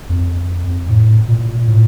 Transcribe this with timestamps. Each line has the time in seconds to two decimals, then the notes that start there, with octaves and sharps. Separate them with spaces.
0.09 F2
0.89 A2
1.28 A#2
1.68 A2